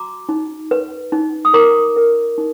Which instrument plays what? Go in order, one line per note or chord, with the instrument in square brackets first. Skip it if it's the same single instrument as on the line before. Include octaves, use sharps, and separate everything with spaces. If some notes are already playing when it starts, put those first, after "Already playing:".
Already playing: [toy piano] F#4 A#5 D6
D#4
B4
D#4
D#6
A#4 A#5 D6
A#4
D#4